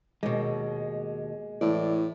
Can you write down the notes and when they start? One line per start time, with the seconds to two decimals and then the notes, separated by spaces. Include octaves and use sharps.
0.23 D#2 B2 G#3
1.61 A2 E3 D5